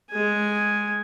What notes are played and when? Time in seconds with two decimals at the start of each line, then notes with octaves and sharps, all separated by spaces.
0.11 G#3 G#5